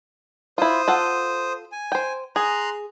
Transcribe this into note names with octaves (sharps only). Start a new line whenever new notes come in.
E4 F4 C5 D#6
F4 A4 F#5
G#5
C5 G5
G#4 A#5 C6 F#6